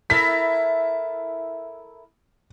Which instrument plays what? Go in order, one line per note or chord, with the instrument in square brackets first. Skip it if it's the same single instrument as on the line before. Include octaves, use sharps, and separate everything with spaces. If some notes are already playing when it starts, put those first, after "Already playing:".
[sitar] E4 A4 A#4 [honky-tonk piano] B6